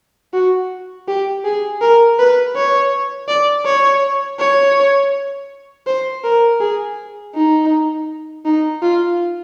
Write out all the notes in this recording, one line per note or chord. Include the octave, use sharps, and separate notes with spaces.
F#4
G4
G#4
A#4
B4
C#5
D5
C#5
C#5
C5
A#4
G#4
D#4
D#4
F4